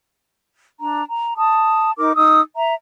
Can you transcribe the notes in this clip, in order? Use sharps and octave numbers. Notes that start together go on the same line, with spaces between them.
D4 A#5
A#5
A5 D#6
D#4 A#4 D6
D#4 D#6 E6
E5 A#5